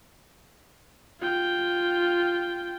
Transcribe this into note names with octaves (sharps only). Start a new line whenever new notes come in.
F4 G5